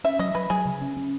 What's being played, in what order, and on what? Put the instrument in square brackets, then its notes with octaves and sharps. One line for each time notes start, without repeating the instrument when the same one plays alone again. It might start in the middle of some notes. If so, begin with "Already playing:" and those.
[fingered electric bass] C#4 [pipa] E5
[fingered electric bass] F#3 [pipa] D#5
[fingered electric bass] F#3 [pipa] B4
[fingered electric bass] F#3 [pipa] G#4
[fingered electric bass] C#3
C#4
C#4